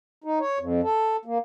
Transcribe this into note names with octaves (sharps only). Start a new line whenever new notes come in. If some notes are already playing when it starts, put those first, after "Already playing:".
D#4
C#5
F2
A4
A#3